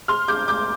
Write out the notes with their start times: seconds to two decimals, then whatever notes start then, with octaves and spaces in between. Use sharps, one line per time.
0.08 C6 F6
0.28 D6 G6
0.48 D6 G6